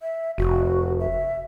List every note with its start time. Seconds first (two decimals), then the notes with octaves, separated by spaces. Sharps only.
0.02 E5
0.38 F1 F#4
1.00 E5